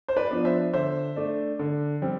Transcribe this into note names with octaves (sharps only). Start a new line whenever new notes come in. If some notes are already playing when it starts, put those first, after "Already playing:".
C5
B4 D5
F3 B3 D4
C5 E5
D3 C5 E5
A3 D4
D3
G3 C4